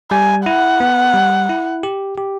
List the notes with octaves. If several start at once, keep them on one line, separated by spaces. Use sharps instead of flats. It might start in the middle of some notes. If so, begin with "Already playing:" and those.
G3 G#5
E4 F#5
B3
G3
E4
G4
G4